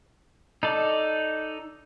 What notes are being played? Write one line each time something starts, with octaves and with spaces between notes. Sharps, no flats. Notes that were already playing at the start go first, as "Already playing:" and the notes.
D#4 A4 D5